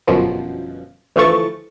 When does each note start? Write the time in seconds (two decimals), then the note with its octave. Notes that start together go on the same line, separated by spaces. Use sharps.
0.07 G1 F#2 B2 F3
1.16 D2 E3 F3 A3 C#6 A6